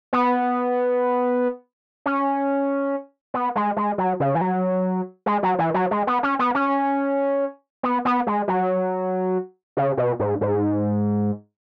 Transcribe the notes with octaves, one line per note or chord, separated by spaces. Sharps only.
B3
C#4
B3
G#3
G#3
F#3
C#3
E3
F#3
G#3
F#3
E3
F#3
G#3
B3
C#4
B3
C#4
B3
B3
G#3
F#3
C#3
B2
G#2
G#2